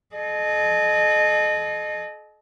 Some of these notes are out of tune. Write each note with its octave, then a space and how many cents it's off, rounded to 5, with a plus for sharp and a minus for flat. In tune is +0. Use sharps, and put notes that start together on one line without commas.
A4 -45 D#5 -25